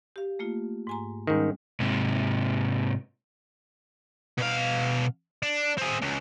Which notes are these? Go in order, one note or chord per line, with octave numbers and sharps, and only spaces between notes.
G4 F5
A3 A#3 F4
G#2 G#5 A#5
G#2 D#3 G3 C#4
G#2 C3
B2 F5
D4
C4 G#4
C#2